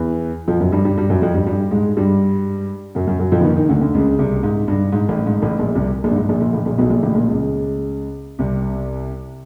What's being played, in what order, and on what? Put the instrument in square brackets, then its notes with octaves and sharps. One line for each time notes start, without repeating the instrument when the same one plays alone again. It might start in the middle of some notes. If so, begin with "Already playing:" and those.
Already playing: [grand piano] E2 E3
F2 F3
F#2 F#3
G2 G3
G2 G3
G2 G3
F#2 F#3
F2 F3
G2 G3
G2 G3
G#2 G#3
G2 G3
F#2 F#3
F#2 F#3
F#2 F#3
F2 F3
E3
D#2 D#3
D#2 D#3
D2 D3
D2 D3
C#2 C#3
C2 C3
G#2
G2
G#2
A1 A2
G#2
A1 A2
A#1 A#2
C2 C3
A#1 A#2
G2
G#2
A#1 A#2
A#1 A#2
A1 A2
A#1 A#2
B1 B2
A#1 A#2
A1 A2
A#1 A#2
C#2 C#3
C2 C3